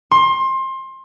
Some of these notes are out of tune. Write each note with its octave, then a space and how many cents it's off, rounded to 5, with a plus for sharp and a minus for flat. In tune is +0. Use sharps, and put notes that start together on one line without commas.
C6 +25